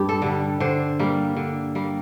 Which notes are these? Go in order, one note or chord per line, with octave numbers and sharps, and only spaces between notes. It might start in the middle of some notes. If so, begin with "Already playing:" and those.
Already playing: G2 G4
A4
D3 G3
D3 C5
G3 A#3
D3
G3 A#3